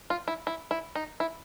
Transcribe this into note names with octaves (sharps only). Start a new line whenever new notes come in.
F4
E4
E4
E4
D#4
E4